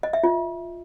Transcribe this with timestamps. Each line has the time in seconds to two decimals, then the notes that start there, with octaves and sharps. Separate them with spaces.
0.03 D#5
0.13 E5
0.24 F4